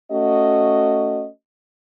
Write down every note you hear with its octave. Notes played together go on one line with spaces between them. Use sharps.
A3 C#4 F#4 D#5